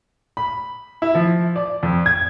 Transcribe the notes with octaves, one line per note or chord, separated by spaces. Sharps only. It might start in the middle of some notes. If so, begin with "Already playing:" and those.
B5
E4
F3
D5
F2
G#6